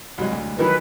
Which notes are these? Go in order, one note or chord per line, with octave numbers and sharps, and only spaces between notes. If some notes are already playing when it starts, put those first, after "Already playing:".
C2 F#3 G#3
D2
D#3 E3 F#3 B4